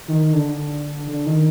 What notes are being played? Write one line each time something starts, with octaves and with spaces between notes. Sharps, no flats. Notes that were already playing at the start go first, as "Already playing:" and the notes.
D#3
D3
D3
D#3